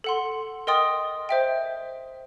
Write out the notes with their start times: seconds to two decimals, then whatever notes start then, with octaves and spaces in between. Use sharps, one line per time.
0.04 A4 F#5 C6
0.67 A#4 D#5 G5 C6 D#6 A6
1.29 C5 E5 G5